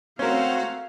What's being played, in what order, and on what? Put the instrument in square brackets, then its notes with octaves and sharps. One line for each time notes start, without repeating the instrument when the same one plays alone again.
[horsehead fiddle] A3 F5 [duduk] C4 [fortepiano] C#4 A#4 [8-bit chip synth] F#4 C5